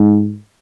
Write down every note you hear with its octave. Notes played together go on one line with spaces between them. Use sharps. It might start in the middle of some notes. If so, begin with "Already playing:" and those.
Already playing: G#2